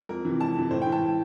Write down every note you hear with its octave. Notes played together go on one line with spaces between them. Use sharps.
F2 A#4
C3 E3
F2 A5
C3 E3
A2 C5
G5
E3
A5
A2